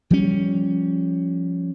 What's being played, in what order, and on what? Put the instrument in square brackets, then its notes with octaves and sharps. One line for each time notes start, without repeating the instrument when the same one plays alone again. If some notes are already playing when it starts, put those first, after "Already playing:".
[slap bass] F3 G3 C#4